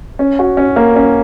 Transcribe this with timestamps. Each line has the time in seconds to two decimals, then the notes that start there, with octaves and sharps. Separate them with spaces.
0.19 C#4
0.39 F#4
0.57 C#4
0.76 A#3
0.96 C#4